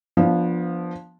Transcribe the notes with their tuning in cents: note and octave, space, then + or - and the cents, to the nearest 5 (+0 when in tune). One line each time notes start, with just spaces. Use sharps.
F3 +0 B3 -20 D4 +5